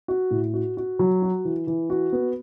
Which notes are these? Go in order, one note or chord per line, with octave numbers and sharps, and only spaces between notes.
F#4
A2
F#4
F#4
F#3
F#4
E3
E3
F#4
B3